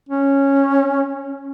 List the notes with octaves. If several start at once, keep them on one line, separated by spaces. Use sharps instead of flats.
C#4